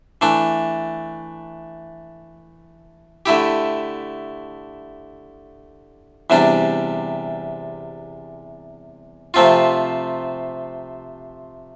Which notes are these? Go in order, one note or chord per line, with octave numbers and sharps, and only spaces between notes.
E3 A3 D4
D3 A3 E4 G4
E2 C3 G3 D4
C3 F3 A3 C4 F4